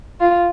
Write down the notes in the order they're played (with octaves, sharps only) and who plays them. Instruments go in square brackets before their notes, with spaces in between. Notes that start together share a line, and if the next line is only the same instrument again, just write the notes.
[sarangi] F4